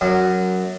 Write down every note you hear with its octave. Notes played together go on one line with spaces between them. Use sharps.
F#2